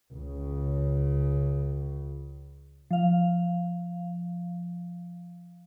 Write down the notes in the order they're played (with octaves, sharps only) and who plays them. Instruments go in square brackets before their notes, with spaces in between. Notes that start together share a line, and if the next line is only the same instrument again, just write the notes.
[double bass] C#2 C#3
[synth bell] F3 F5